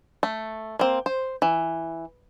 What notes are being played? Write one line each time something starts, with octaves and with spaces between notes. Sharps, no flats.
A3
A#3 C4
C5
E3